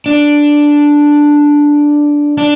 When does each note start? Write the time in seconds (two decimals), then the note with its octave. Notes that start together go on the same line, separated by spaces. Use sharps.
0.06 D4
2.38 D4